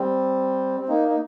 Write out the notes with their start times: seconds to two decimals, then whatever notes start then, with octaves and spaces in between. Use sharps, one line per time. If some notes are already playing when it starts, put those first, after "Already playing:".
Already playing: G3 C4
0.80 C4
0.89 A#3 D#4
1.08 D#4